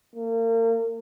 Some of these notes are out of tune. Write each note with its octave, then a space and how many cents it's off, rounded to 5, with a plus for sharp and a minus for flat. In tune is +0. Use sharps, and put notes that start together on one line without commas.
A#3 -35